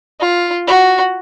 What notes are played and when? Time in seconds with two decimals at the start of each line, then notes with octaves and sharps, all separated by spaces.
0.20 F4
0.67 F#4